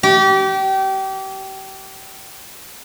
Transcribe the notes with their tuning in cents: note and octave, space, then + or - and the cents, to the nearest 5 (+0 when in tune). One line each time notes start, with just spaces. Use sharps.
G4 -30